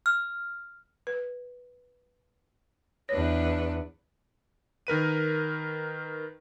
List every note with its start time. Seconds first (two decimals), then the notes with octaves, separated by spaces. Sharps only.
0.06 F6
1.07 B4
3.09 E2 D4 B4 C#5
4.87 D#3 A#4 B4 D#7